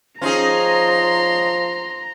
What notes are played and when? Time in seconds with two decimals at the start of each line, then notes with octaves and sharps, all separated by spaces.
0.22 F3 C#4 D#4 G#4 A#5 C6